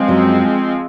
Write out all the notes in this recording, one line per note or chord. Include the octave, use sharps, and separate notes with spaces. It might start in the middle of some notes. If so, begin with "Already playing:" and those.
Already playing: F3 G#3 C4
F#2 F#3